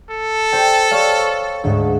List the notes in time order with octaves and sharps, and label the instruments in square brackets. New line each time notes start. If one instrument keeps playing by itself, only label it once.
[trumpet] A4
[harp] C5 G5
C5 C#5 F5
D2 G#2